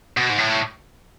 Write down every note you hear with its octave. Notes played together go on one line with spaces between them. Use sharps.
B2
G#2
A2